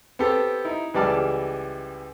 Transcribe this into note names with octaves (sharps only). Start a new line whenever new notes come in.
B3 C4 G4 A4
D#4 E4
C#2 E3 G3 D5 A5 F6